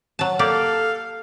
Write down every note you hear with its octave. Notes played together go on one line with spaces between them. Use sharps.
F#3 A5
A#3 G4 A4 D5 F5